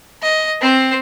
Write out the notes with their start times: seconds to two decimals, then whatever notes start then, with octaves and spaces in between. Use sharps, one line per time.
0.22 D#5
0.61 C4 C5